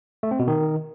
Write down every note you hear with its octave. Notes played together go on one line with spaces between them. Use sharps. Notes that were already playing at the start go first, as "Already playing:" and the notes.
A3
C4
B2
D#3